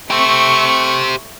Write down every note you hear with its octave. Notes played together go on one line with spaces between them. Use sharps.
A3 G4 C5 C#6